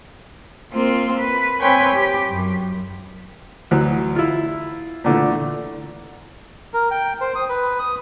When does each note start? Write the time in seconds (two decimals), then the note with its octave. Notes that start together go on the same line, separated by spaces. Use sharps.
0.73 A#3 C4 F4
1.19 B4
1.60 C4 B4 C#5 G5 G#5 C6
1.94 G4
2.30 F#2
3.71 D2 E3 F#3
4.16 E4 F4
5.04 A#2 D3 E3 A3
6.74 A#4
6.91 G5
7.21 C5
7.36 D#6
7.49 B4
7.79 D#6